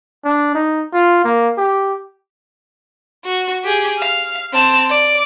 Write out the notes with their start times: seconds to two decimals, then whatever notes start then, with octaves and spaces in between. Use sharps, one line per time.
0.25 D4
0.55 D#4
0.94 F4
1.25 A#3
1.57 G4
3.25 F#4
3.64 G4 G#4
3.99 F5
4.53 C4 A5
4.90 D5